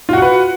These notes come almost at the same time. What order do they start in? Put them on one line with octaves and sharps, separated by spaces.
F4 F#4 F#5 B4